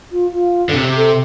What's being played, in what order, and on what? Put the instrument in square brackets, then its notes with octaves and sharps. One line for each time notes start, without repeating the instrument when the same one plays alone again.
[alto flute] F4
F4
[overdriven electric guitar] D3
[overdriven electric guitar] C3 [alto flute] G4
[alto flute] A4